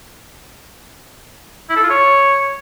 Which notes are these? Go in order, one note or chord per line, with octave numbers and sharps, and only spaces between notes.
E4
A4
F4
C#5